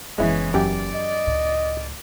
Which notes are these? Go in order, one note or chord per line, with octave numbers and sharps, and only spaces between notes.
F#1 E2 E3 G#3 B3 C#4 E4
F#2 G4 D5 G5
D#5
C#2 A2